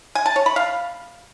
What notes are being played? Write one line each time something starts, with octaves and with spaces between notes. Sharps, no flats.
G#5
A5
C#5
B5
F5